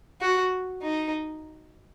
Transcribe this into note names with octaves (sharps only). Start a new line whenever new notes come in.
F#4
D#4